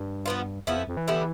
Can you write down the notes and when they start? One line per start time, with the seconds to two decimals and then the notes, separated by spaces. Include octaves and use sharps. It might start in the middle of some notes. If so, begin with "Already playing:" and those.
Already playing: G2
0.26 F3 B3 F4
0.67 E2 F3 B3 E4
0.77 F2
0.88 F2
0.97 E3
1.08 D3 G3 B3 E4